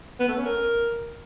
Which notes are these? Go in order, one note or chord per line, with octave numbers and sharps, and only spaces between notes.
B3
A3
C#4
A#4